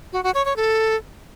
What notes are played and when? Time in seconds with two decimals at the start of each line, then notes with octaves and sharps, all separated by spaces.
0.13 F#4
0.24 F#4
0.35 C#5
0.45 C#5
0.56 A4